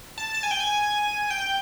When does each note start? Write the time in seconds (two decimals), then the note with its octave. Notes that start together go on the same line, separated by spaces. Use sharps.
0.18 A5
0.34 A5
0.43 G#5
0.51 G5
0.60 G#5
1.30 G5